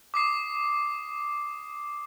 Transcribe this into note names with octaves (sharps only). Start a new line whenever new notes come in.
D6 D#6 C7